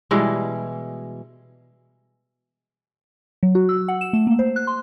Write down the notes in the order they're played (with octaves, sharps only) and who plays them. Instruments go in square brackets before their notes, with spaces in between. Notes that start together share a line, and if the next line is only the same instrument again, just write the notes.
[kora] B2 E3 G3 G#3
[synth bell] F#3
F#4
E6
F#5
E7
A3
A#3
C5
F#6
C6